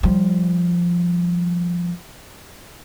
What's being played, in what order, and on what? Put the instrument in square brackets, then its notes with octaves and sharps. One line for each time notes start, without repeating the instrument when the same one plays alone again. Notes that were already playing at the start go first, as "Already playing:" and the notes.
[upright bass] F3 G3